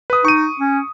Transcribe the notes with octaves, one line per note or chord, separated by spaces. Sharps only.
B4 D#6
D#4 C#6 D#7
C#4